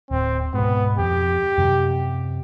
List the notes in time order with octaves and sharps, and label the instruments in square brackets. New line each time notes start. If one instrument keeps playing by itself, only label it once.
[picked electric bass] D1 [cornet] C4
[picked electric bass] G#2 B2 [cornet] B3
[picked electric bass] F2 [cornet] G4
[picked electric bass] F#2 C3 F#3